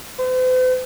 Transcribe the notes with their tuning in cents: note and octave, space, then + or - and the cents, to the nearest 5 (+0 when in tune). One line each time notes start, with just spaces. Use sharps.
C5 -45